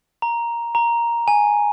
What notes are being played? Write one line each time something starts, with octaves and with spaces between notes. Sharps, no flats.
A#5
A#5
G#5